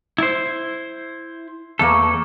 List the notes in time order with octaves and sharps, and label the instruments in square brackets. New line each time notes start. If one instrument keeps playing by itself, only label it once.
[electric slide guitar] E4 C5
[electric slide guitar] E2 A4 [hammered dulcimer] A3 A#3